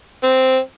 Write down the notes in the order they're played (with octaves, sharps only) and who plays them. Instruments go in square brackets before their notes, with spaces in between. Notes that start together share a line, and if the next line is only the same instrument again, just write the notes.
[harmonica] C4